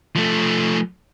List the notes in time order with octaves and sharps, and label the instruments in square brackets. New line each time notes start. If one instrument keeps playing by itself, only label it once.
[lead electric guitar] F3 A3